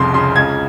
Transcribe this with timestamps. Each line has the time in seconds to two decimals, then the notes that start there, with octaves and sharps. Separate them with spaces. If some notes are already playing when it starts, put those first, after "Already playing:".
Already playing: F1 C2 F2 C#3 C6
0.14 C#3 C6
0.36 C#2 G#6